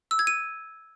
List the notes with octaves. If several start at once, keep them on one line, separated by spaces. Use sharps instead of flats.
E6
G#6
D#7